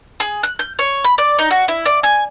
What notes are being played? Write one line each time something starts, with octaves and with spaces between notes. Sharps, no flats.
G#4
F#6
G6
C#5
B5
D5
D#4
F#4
E4
D5
G#5